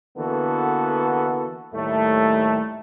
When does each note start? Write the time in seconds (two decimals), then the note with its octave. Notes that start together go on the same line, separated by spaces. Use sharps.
0.17 D3 E3 A#3 B3 F#4 A4
1.74 D#2 A2 G3 A3